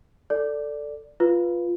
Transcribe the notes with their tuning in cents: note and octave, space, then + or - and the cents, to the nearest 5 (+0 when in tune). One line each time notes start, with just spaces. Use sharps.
A4 +10 D5 +0
F4 +0 B4 -5